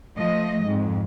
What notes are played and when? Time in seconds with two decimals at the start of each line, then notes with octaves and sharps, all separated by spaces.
0.15 F3 A3 D#5
0.66 F2 G#2